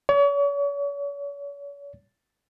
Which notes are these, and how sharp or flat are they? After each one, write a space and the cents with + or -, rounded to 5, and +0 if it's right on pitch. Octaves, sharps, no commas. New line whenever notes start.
C#5 +40